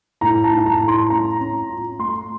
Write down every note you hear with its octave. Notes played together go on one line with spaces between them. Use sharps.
A2 A#5
A5
D#4
A5
A#5
A2
C6
C#4 A#5
C#4
F4
A3 C6